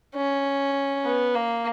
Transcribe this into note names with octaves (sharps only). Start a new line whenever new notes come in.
C#4
B3
A#3